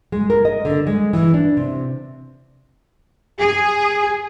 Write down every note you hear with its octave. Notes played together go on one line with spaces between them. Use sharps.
G#3
A#4
D#5
D3
G#3
E3
D4
C3
G#4